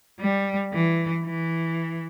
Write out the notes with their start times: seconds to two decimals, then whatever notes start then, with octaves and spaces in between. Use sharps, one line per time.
0.20 G3
0.73 E3
1.25 E3